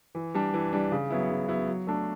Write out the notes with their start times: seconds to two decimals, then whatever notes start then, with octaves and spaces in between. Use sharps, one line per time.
0.15 E3
0.34 G3 D4
0.54 E3
0.73 G3 D4
0.92 C#3
1.10 F#3 B3 E4
1.30 C#3
1.48 F#3 B3 E4
1.68 F#3
1.87 A3 D4